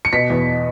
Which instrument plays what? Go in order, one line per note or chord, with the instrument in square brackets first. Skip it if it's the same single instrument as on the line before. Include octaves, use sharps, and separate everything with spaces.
[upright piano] C#7
B2 B6
E2